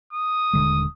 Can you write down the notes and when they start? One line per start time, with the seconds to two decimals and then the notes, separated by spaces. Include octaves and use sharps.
0.13 D#6
0.53 D#1 D3 G#3